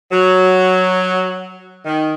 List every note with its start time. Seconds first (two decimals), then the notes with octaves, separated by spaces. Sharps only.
0.12 F#3
1.85 D#3